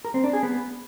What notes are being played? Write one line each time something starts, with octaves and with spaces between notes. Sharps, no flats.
A#4
C4
D4
G#4
B3